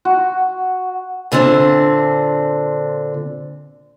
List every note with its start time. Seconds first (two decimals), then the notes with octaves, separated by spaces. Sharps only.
0.05 F#4
1.32 A#2 D3 C4 D4